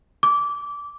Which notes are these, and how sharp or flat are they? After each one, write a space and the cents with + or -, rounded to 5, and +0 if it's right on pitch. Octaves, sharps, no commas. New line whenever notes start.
D6 -20